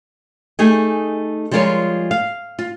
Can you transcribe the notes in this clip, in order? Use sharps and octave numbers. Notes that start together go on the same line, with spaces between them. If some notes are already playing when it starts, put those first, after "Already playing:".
A3 D#4 G4 G#4 G#5
F3 G3 G#3 F4 A#4 C#5
F5
F4